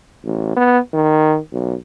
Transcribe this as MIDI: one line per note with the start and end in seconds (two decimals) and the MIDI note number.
0.24 0.54 33
0.57 0.79 59
0.94 1.38 51
1.52 1.74 35